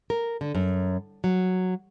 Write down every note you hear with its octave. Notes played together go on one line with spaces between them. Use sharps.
A#4
D3
F#2
F#3